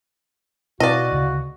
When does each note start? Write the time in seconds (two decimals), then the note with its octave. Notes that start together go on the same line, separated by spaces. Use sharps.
0.80 B2 C4 E4 F#4 B4 D5 D#5 F5
1.12 D2 C#3